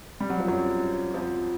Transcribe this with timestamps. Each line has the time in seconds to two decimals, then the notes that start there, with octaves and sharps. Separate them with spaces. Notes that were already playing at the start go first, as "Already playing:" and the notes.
0.20 G3
0.30 F#3
0.40 F3
0.48 F#2 F#3
1.14 F2 F3